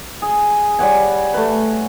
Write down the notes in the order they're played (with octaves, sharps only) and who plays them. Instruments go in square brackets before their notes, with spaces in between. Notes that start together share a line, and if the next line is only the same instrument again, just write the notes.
[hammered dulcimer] G#4
G3 C#5 F#5 G#5
A3 B4